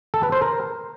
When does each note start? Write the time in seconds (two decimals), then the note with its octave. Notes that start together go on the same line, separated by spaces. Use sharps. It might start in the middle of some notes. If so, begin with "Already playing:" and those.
0.14 A4
0.23 B4
0.32 C5
0.42 A#4